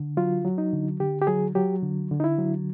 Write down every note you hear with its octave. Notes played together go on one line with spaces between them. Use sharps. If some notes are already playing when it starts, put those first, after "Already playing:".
Already playing: D3
F#3 F4
F#3
D#4
D3
D3 G4
G4
F#3 G#4
F#3 G4
D3
D3
D#4
E4
F#3